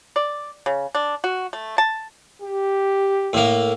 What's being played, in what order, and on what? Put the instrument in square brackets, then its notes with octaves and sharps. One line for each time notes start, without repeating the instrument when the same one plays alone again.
[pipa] D5
C#3
D4
F#4
A3
A5
[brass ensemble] G4
[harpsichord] A2 A#3